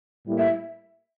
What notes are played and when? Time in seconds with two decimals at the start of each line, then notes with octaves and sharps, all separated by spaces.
0.26 A2 G3 A#3 E4
0.38 E5